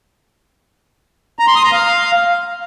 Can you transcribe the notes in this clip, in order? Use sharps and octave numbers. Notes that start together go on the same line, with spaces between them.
A#5
C6
D#6
A#5
F5